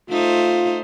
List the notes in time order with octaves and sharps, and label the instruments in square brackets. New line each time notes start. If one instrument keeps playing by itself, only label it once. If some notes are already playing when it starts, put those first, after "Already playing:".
[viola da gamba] A3 D#4 C5 [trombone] F4